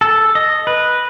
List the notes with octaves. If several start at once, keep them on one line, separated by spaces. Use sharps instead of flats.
A4
D#5
B4